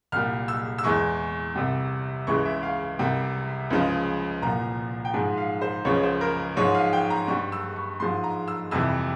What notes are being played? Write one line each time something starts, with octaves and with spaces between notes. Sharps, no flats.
C2 A#2 G3 F6
E6
E6
E2 E3 G#3 C#6
C2 C3 G3
C#2 C#3 E3 G#3 C#6
E5
F5
C2 C3 G3
C#2 C#3 F3 G#3
C2 A#2 F3 A#5
G5
G#2 F3 G#3 G#5
F5
C5
C#2 C#3 F3 C#5
C5
A#4
G#2 F3 G#3 C#5
F5
G5
A#5
G2 G3 C#6
E6
C#6
G#2 F3 G#3 C6
A#5
E6
F2 C3 E3 G3 E6